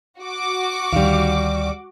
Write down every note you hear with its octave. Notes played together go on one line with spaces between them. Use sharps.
F#4 D6
D2 D#3 G3 F5